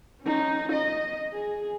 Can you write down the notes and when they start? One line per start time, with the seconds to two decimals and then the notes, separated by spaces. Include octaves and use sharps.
0.22 C#4 D#4
0.72 D#5
1.33 G#4